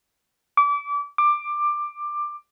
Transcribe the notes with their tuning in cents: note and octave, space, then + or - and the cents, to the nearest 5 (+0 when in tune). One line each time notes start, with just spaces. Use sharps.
D6 -30
D6 +15